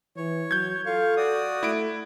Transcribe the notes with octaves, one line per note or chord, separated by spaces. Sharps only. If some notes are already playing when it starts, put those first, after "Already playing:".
E3 C#5
F#3 G6 G#6
F4 A4 F5 C#6
F#4 D5 D#6
A3 E4 D7